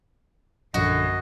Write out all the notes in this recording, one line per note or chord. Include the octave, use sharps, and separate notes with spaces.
A#1 F#2 D3 F#4 D#5